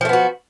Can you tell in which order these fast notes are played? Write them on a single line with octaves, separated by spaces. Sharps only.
F3 A3 B3 F#4